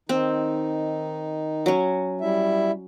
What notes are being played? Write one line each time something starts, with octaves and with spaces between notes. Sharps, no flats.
D#3 C4 D#4
F#3 C#4
G3 E4 E5